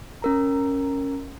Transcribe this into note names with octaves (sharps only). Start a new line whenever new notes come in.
C#4 A#4 A#5